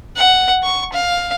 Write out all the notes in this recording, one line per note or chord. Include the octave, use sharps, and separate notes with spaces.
F#5
C#6
F5